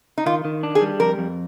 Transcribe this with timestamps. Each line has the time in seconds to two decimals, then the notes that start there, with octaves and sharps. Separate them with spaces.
0.18 D#4
0.26 D#3 F4
0.45 D#3
0.63 D4
0.75 G#4
0.81 G3
1.00 F2 A#4
1.18 F2